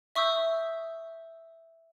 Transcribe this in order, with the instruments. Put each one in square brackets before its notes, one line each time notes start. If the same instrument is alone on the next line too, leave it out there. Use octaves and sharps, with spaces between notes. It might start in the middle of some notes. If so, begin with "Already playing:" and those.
[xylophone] E5 C#6 D#6 E6 G6